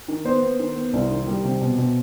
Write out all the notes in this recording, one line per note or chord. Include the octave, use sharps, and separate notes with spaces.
D#3
B3 C5
B3
D#3
B3
C2
D#3
G3
C3
B2
B2